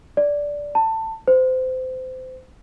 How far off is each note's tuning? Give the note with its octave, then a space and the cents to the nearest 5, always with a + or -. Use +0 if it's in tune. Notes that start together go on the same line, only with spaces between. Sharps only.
D5 -10
A5 +20
C5 -25